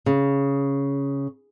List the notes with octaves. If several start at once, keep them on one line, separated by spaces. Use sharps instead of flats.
C#3